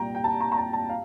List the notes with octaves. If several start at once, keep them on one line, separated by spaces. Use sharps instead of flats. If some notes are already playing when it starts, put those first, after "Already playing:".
Already playing: C2 A#2 G3 G5 A#5
G5
A5
A#5
A#5
A5
A5
F5